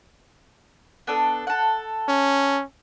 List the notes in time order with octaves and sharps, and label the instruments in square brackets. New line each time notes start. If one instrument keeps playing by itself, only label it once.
[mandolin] B3 D4 A4
A4 F#5
[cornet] C#4